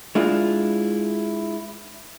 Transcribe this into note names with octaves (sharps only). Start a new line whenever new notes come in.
G#3 D4 E4 F4